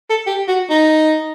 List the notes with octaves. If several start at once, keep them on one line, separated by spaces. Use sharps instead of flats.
A4
G4
F#4
D#4